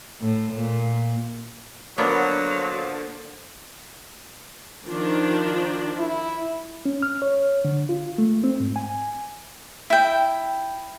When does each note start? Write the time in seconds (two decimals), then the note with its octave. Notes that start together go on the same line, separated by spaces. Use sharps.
0.21 A2
0.54 A#2
1.98 D3 F3 F#3 A#3 B3 D4
4.86 D#3 F3 D4 F4
5.98 E4
6.85 C#4
7.02 F6
7.22 C#5
7.65 D3
7.89 F4
8.18 A3
8.44 C4
8.60 G#2
8.76 G#5
9.90 E4 G5